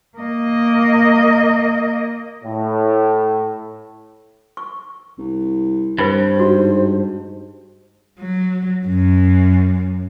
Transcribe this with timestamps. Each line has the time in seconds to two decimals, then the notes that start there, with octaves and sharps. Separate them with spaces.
0.17 A#3 D#5
2.44 A2
4.57 C#6
5.18 C2
5.98 G2 B4 C5 B5
6.39 G#2 F#4
8.19 F#3
8.86 F#2